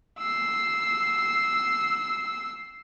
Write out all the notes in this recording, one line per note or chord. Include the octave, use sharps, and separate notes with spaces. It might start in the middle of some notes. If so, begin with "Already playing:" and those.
E6 C7